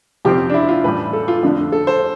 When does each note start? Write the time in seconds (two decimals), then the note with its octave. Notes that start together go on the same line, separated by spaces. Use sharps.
0.25 F2 C3 F3 C4 G4
0.50 D4
0.54 E4
0.69 F4
0.84 A2 E3 G3 B4
1.13 A4
1.28 F4
1.43 F2 D3 A3 D4
1.72 A4
1.87 C5